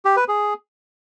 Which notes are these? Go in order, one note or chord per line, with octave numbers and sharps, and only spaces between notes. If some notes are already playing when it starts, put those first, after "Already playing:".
G4
B4
G#4